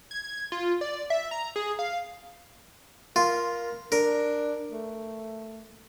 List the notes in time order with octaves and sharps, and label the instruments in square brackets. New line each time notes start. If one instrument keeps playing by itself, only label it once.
[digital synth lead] G#6
F4
D5
E5
A#5
G#4
F5
[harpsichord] F4 [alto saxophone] A#4
[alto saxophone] D4 [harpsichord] A#4
[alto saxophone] A3